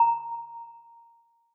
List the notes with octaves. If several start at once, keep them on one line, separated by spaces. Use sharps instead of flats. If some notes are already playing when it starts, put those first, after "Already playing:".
Already playing: A#5